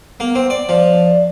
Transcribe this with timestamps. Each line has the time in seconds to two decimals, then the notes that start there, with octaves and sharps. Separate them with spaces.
0.20 A#3 B3
0.35 C4
0.50 D5
0.69 F3 D5